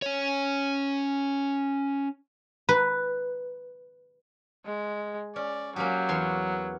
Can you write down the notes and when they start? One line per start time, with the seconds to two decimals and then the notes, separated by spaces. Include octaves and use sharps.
0.02 C#4 C#5
2.69 B4
4.65 G#3
5.36 C#4 D5
5.76 F#3 A#3 C#4 G4
6.09 E2 C#5 C6